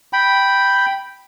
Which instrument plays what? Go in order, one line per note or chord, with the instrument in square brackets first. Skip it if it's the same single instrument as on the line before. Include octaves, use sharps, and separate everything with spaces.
[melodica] G5 B5